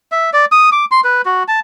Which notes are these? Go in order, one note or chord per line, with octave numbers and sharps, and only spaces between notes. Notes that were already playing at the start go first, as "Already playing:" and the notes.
E5
D5
D#6
D6
C6
B4
F#4
A5